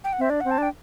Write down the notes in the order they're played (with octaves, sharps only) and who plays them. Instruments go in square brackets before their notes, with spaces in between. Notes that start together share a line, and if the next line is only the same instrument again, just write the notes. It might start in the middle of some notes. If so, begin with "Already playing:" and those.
[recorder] G5
F#5
[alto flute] C4 [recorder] E5
[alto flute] D4 [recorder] D5
[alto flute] C4 [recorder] F#5
[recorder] A5
[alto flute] D4 [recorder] G5